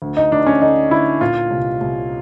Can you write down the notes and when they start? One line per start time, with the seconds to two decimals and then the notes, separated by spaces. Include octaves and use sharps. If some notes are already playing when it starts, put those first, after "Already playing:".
0.02 D2
0.17 D#4
0.32 D2 D4
0.46 C#4
0.62 D3 D#4
0.91 D2 E4
1.21 A#2 F4
1.50 C2
1.81 C2